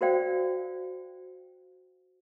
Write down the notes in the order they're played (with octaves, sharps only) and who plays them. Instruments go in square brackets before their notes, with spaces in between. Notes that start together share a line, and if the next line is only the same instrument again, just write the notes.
[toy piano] F#4 A#4 C5 D5 F5 G5